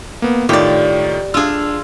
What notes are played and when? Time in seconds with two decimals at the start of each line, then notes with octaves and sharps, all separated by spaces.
0.22 A#3 B3
0.49 A2 D#3 F4 G4 D5
1.34 D4 F4 G#4 E6